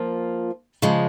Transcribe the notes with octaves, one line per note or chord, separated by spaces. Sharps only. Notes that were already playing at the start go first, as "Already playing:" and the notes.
Already playing: F3 A#3 F4
C#3 F3 G#3